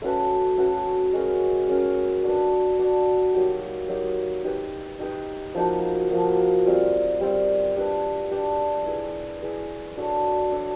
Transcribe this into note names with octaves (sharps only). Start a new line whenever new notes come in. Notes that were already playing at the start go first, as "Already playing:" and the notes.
A3 C#4 F#4 B4
A3 C#4 F#4 B4
G#3 C#4 F#4 A#4
G#3 C#4 F#4 A#4
D4 F#4 B4 D5
D4 F#4 B4 D5
F#3 A#3 D#4 G4
F#3 A#3 D#4 G4
D#4 G4 B4 D#5
D#4 G4 B4 D#5
F3 A#3 D#4 F#4
F3 A#3 D#4 F#4
G3 C4 F4
G3 C4 F4
D4 G4 B4
D4 G4 B4
E4 G#4 B4
E4 G#4 B4
D4 F#4 A4 C#5
D4 F#4 A4 C#5